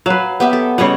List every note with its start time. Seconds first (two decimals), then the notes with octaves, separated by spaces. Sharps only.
0.06 F#3 B4 F5
0.40 B3 G4 E5
0.53 A4
0.78 C#3 G3 C#5 D#5 F#5